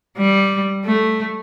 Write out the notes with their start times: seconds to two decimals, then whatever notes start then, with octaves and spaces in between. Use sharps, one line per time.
0.18 G3
0.86 A3